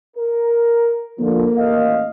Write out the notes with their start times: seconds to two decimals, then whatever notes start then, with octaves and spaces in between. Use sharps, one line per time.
0.17 A#4
1.19 D3 F3 A#3
1.57 A1 D#5 F5